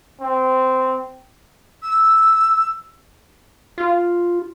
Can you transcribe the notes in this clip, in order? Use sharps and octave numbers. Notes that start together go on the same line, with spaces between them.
C4
E6
F4